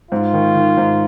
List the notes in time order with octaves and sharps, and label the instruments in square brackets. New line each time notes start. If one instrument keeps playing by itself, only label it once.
[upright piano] G#2 [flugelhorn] F4
[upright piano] D#3
D#3
G#2